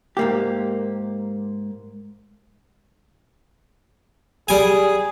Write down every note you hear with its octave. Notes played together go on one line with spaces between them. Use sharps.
G#2 A#3 G4
G3 G#4 G#5